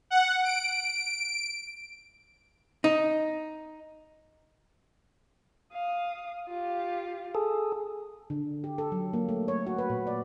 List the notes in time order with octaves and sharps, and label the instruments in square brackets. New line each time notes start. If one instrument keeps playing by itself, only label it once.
[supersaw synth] F#5
D7
[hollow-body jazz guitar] D#4
[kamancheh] F5 D#6
F4 G4
[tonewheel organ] G#4 A4
[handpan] D3
G4
A4
F#3
A#3
A3
C#5
F#4
B4
A#2
D5